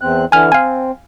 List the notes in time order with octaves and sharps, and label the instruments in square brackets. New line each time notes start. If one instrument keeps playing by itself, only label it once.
[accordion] E2 C4 F#6
[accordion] D3 E3 [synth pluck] G#5 F6
[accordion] C4 [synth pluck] F5 G#5